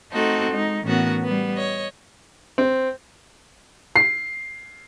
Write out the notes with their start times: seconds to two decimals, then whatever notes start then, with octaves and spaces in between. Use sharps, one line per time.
0.13 A3 C4 D#4 F#4 A4
0.52 G#3 D#4
0.86 A2 E3 B3 C#4 F#4 A#4
1.25 G3 B3
1.54 C#5 D#5
2.58 C4
3.96 C7